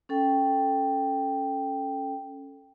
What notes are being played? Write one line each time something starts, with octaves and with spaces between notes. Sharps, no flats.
C#4 A4 G5